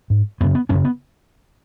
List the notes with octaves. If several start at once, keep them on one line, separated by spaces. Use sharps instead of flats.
G#2
F#2 C#3 B3
B3
F#2 C#3 C#4
B3